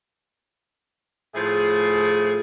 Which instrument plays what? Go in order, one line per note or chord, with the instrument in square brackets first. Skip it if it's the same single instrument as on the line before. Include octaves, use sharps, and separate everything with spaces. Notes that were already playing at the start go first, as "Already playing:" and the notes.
[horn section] A2 F3 A3 G#4